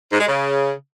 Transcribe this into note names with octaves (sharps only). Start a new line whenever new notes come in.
G#2
G#3
C#3